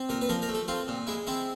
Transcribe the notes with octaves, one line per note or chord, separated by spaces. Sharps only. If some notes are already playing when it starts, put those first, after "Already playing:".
Already playing: C4
A#2 A#4
B4
F3 A#4
A#4
A3
A4
C4 F4
A#2
G#3 E4
C4 E4